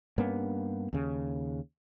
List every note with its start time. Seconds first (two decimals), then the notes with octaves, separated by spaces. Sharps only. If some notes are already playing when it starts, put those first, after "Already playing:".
0.18 G2 A#3 B3 C#4
0.93 D#2 C#3